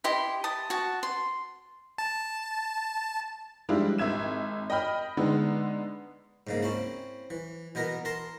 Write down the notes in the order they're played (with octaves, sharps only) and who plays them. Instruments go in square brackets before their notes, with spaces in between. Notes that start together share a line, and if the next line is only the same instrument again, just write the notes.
[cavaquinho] E4 G4 D#5 C6
A5 D#6
F#4 A5
C6
[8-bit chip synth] A5
[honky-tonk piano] F3 G3 G#3 D4 E4 F4
G#1 E5 G#6 E7
D#5 G5 B5 F6
D3 G#3 B3 D#4
[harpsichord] G#2 C#3 A#3
C4 C#4 E4
E3
B2 E3 B3 A#4
A#4 A5 C6